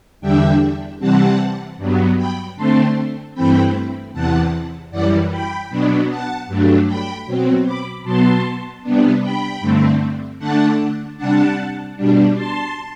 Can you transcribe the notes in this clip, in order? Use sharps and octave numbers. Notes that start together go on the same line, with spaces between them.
E2 D3 G3 D4 E5 G5
C3 E3 G3 C4 F#5 A5
G2 F#3 B3
G5 B5
D3 A3 C4 A5 C6
G2 E3 A3 C4 G5 B5
E2 C3 E3 F#5 A5
F#2 E3 G3 D5 F#5
G5 B5
B2 F#3 B3 D4
F#5 A5
G2 F#3 A3 D4
G5 B5
B2 F#3 C4
B5 D6
B2 F#3 B3 A5 C6
C3 G3 B3 D4
G5 B5
G2 D3 A3 C4
D3 A3 D4 F#5 A5
C3 G3 D4 F#5 A5
B2 G3 D4
A5 C6